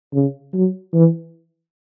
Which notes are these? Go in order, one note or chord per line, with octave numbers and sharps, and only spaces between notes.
C#3
F#3
E3